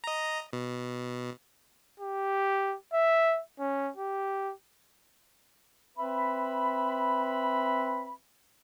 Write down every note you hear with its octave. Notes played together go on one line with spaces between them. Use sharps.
D#5 A#5
B2
G4
E5
C#4
G4
C4 B4 E5 B5